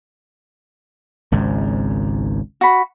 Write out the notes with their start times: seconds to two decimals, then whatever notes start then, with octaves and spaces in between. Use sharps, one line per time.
1.32 G#1 C#2 G#2
2.61 F#4 B5